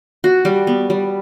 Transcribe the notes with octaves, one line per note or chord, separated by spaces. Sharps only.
F#4
G3
B3
G3